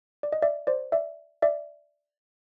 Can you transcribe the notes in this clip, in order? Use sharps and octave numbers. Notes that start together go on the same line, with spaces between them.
D5
D#5
D5 E5
C5 D5
D5 E5
D5 E5